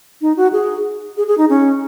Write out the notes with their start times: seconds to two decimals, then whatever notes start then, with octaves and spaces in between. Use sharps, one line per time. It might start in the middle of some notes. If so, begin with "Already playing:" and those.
0.21 D#4
0.37 F#4
0.53 G#4
1.17 G#4
1.27 G#4
1.38 D#4
1.49 C#4